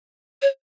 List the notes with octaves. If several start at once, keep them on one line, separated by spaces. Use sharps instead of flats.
C#5